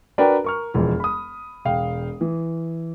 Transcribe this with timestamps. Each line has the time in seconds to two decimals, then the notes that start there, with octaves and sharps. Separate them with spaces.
0.18 D4 F#4 A#4 B4 D5 G5
0.44 A#4 C#6 F6
0.74 E1 F2 E3 G#3
1.00 B5 D#6
1.65 E1 F5 G5
2.21 E3